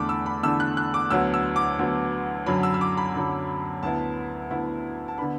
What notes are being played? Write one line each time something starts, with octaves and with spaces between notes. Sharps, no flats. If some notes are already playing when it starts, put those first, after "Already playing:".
Already playing: E2 D3 A3 D4 B5 D6
E6
B5
E2 D3 A3 D4 E6
F#6
F#6
D6
D2 D3 F#3 B3 E6
E6
D6
D2 D3 F#3 B3
F#2 D3 F#3 B5
E6
E6
D6
B5
F#2 D3 F#3
D2 D3 B3 E4 A5
D2 D3 B3 E4
A5
D3 B3 D4 B5